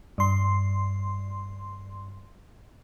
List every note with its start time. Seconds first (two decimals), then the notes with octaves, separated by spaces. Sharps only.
0.18 G2 C6